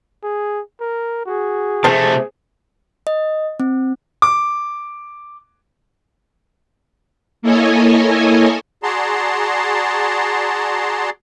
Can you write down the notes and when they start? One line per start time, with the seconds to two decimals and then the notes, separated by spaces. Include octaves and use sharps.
0.23 G#4
0.81 A#4
1.26 F#4 G#4
1.84 C3 A3 C5 A5
3.07 D#5
3.60 C4
4.22 D6
7.42 A#3 E4 A4 C#5 D#5 G#5
8.83 F#4 G#4 D5 A5 A#5 C6